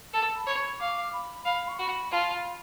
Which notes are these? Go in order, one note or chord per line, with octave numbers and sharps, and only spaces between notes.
A4 A5
B5
C#5
C#6
F5 D6
B5
F5 B5
C#6
F#4 B5
F4 A5
B5